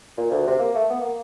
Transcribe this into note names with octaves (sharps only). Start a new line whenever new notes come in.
A#2
D2
C3
A#3
A3
B3
A#3